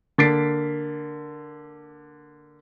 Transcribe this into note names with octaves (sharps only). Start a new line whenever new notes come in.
D3 A#3 A6 B6 C7 D7